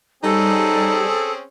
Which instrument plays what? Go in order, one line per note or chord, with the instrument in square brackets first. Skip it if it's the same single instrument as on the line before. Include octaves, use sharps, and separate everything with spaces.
[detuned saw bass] G3 [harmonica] C4 C#4 G#4 [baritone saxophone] D#4 [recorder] A4